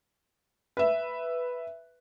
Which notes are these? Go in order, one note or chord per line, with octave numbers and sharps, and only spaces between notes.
B4 E5